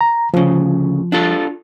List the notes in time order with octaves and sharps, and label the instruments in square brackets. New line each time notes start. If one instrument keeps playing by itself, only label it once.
[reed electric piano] A#5
[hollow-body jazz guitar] D2 C#3 [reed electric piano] F3
[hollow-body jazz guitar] D4 F4 A4